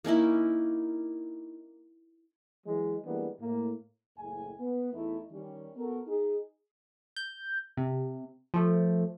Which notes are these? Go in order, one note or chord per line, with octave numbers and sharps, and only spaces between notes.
A#3 C#4 D#4 E4
E3 F#3 G#3
E3 G3 G#3 A#3 B3 D4
A2 A#3
F#1 A2 G#3 G#5
B3
E2 A3 D#4 E4
D#3 G3 C#4
B3 F#4 A4 A#4
D#4 G#4
G6
C3
F3 A3